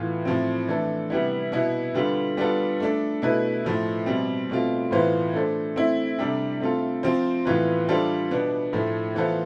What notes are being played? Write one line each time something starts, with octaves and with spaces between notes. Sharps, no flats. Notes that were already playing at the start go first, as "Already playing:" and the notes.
Already playing: A2 E3 B3 F4
A2 F3 C4
E3 A3 D4 A4
C3 G3 B3 E4
B2 B3 E4
D3 G3 B3 F4
G3 B3 D4 F4 A4
A3 D4 A4
B2 A3 E4 B4
A2 F3 A3
B2 G3 C4
B2 A3 C4 F4
A2 E3 B3 F4 C5
A3 D4 A4 C5
A3 C4 E4
C3 G3 D4 A4
A3 C4 F4 A4
F3 C4 F4 C5
A2 E3 B3 F4 B4
G3 D4 F4 A4 C5
B2 B3 D4
A2 F3 A3
E3 B3 F4 A4 C5